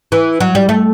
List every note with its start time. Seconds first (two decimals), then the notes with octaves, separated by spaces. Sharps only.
0.12 E3
0.40 F#3
0.55 G3
0.69 A3